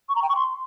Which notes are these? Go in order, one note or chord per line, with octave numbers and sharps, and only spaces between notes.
C#6
A#5
G5
C#6
C6